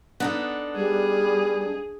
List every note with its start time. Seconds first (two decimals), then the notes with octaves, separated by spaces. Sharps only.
0.20 B3 D4 D#4 A4
0.76 G3 G#4